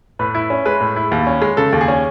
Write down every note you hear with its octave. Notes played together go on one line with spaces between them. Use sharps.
A2 B4
E4
C#4
G#3 B4
A2
E4
D#2
C#4
G#3
C#3 A4
D#2
G#4
C#4